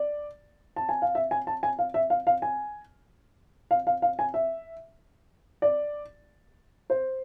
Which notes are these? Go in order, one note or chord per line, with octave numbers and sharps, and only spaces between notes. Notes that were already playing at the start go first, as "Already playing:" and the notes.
Already playing: D5
A5
G#5
F5
E5
G#5
A5
G#5
F5
E5
F5
F5
G#5
F5
F5
F5
G#5
E5
D5
C5